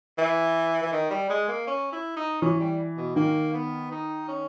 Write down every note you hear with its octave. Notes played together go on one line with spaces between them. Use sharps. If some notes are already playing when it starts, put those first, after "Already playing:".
E3
E3
D#3
G3
G#3
A#3
C#4
E4
D#4
E3 C#4
G3
B2
D#3 A#3
B3
D#4
C#4